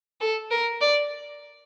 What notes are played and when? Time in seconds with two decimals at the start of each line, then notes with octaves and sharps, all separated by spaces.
0.21 A4
0.51 A#4
0.81 D5